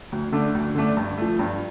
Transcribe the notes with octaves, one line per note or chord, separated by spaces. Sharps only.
D2
D3 A3 D4
D2
D3 A3 D4
G2
F3 A3
G2